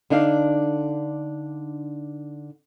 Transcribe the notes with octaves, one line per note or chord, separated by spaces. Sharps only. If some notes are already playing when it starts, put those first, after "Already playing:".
D3 D4 D#4 F5